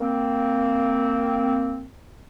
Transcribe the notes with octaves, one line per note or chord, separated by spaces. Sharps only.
A#3 C4